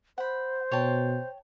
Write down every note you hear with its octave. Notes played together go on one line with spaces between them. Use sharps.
C5 F#5 B5
B2 C#5 G5 A5